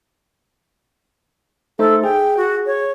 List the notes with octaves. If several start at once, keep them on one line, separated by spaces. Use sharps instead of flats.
A3 D#4 A4 C5
G#4 G5
F#4
C#5